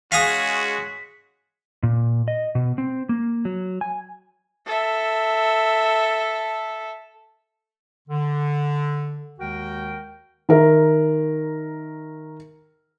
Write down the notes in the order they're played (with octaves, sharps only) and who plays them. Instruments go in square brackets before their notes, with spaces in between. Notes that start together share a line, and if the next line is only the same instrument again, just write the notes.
[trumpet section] G#3 C#4 G#4 [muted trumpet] F#4 [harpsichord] F5 G#5 D#6 [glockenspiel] B6
[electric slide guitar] A#2
D#5
B2
C4
A#3
F#3
G#5
[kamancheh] A4 E5
[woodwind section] D3
D#2 D#3 G#3 F#4 A#4 G5
[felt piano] D#3 A#4 E5